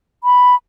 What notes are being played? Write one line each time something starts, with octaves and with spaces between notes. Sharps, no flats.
B5